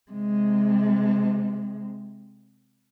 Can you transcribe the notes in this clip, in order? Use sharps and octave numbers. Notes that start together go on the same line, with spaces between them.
C3 G#3